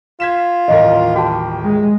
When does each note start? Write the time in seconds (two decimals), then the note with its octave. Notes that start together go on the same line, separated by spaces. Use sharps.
0.20 F4 G#6 B6 E7
0.68 D#1 A1 A#4 D#5
1.16 F#4 G4 A5
1.63 G#3